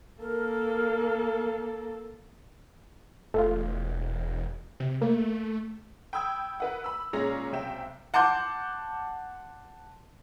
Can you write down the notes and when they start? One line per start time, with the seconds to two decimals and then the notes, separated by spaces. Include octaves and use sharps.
0.21 A#3 A4 A#4
3.34 E1 A3 F4
4.80 C3
5.01 A3 A#3
6.13 G5 B5 D#6 E6 G#6
6.60 A#4 B4 F#5
6.84 B5 E6
7.13 A#2 G#3 C#4 G#4 A#5 A#6
7.52 B1 C3 E5 G5 E7
8.14 F#5 A5 C6 D6 G6